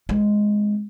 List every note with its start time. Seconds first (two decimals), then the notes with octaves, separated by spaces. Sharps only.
0.09 G#3 C4